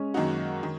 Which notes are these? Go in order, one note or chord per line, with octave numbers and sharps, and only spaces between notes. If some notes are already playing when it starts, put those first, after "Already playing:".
Already playing: G#3 C#4
F#2 D#3 A#3 D#4 F#4
D#3